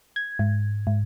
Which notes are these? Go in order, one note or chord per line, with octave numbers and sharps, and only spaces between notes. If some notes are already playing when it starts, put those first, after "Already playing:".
G#6
G#2
G#2